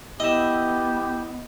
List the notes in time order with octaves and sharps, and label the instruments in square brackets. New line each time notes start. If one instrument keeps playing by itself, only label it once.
[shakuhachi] B3 [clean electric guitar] E4 E5 [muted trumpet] G4 [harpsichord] D#5